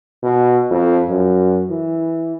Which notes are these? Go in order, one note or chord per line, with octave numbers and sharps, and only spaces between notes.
B2
F2
F#2
E3